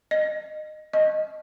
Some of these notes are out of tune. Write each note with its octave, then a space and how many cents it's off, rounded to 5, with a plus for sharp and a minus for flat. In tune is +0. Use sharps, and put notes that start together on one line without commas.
D#5 -20
D#5 -10